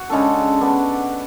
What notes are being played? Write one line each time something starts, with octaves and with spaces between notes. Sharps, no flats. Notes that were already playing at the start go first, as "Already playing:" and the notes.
Already playing: F#4
C#3 G#3 D4 A4
B3 D4